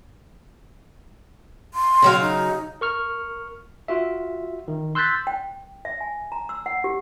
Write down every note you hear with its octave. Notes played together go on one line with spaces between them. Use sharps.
C6
C#3 F#3 F5
D#4
A#4 C#6 F6
F4 F#4 E5
D#3
C6 E6 F#6 G6 A6 B6
G5
E5
G#5
A#5
E6
F#5
G4